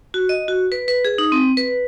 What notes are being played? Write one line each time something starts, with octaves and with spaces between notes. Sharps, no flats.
F#4
D#5
F#4
B4
B4
G#4
D#4
C4
B4